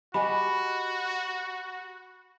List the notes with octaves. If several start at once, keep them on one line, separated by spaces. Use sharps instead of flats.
F#4 G4 D#5 G#5 B5